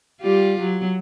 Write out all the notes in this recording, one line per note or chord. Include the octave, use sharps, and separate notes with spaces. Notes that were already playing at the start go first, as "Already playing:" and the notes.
G3 F4 G4
F#3